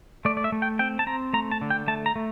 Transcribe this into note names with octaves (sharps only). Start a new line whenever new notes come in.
A3 D5
D5
E5
A3
G5
C4 G5
A5
C4 A#5
A3 A#5
A5
D3
G5
A3 A5
A#5
A3